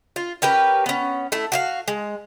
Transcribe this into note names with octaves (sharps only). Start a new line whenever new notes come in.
F4
C#4 G4 A#4 B4
B3 C#4
A3 E4
F#4 E5 F5
G#3